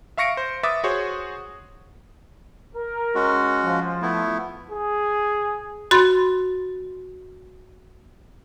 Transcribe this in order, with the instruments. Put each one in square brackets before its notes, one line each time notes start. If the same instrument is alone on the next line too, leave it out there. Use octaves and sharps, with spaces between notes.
[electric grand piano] E5 F5 C#6 A#6 C#7 D7
C5
B4 E5 D6 D#6 A6
F#4 G#4 C5 C#5 C#6
[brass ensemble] A#4
[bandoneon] G#3 C#4 F#4
[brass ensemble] F3
[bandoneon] A3 B3 E4
[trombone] G#4
[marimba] F#4 B5 C6 A6